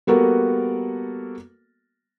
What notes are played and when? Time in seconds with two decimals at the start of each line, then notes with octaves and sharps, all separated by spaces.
0.07 G3 A#3 B3 F#4 A4 A#4